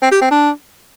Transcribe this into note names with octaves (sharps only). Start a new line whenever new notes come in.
C4
G4
C4
D4